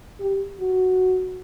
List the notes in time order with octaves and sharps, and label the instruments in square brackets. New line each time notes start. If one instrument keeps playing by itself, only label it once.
[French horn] G4
F#4